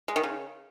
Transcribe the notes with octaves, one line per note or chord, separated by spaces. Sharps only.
G#3
D#3
C#3